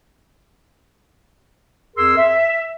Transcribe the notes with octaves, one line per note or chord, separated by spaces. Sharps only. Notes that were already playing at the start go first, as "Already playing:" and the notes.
F2 G#4 A#4 C6 E6
E5